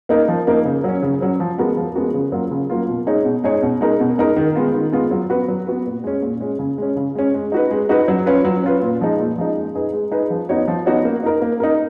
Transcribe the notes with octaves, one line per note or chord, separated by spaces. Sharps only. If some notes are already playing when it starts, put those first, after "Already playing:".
A#3 D#4 A#4
F3
A#3 D#4 A#4
C#3
F#3 C#4
C#3
F#3 C#4
F3
G#3 B3 F#4 A#4
F3
G#3 B3 F#4 A#4
C#3
F#3 A#3 F4
C#3
F#3 A#3 F4
B2
G#3 D#4 G#4 C#5
B2
G#3 D#4 G#4 C#5
B2
G#3 D#4 A#4
B2
G#3 D#4 A#4
D#3
G#3 B3 F4
D#3
G#3 B3 F4
F#3
B3 F#4 B4
F#3
B3 F#4 B4
A#2
G#3 C#4
A#2
G#3 C#4
C#3
G#3 C#4
C#3
G#3 C#4
G#3
D#4 F#4 B4
G#3
D#4 F#4 B4
F#3
C#4 F4 B4
F#3
C#4 F4 B4
A#2
F3 G#3 D#4
A#2
F3 G#3 D#4
G#3
D#4 G#4 B4
G#3
D#4 G#4 B4
F3
B3 D#4 F#4 C#5
F3
B3 D#4 F#4 C#5
A#3
D#4 A#4
A#3
D#4 A#4